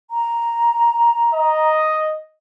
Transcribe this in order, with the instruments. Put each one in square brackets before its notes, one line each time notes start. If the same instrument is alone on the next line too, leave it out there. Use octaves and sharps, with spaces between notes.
[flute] A#5
[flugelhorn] D#5